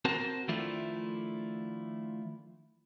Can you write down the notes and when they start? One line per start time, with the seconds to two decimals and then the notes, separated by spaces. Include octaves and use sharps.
0.05 C4 F#4 A#4 C5 A5
0.48 D#3 F3 A3 D4 E4 F4